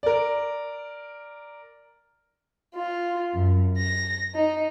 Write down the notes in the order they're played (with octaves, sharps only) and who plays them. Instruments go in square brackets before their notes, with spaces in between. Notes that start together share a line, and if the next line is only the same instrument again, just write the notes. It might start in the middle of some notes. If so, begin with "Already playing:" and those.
[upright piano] A#4 D5
[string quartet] F4
F#2
A#6
D#4